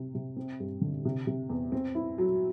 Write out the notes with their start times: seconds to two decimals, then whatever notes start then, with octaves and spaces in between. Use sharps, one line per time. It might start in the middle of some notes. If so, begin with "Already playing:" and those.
Already playing: C3
0.15 C3
0.37 C4
0.60 G2
0.81 D3
1.05 C3
1.27 C3
1.49 E2
1.72 C4
1.95 E4
2.18 F#3